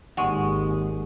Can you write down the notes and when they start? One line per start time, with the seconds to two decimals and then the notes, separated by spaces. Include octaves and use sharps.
0.17 G#1 D#2 G#3 F#5 C#6